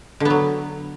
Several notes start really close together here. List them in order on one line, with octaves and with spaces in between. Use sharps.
D3 B3 F#3